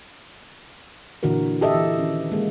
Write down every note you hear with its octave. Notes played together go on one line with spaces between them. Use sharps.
A#2 D3 E3 F#4 A#4
G4 A4 D#5 E5
E3
D#3 C#4
G#3 A#3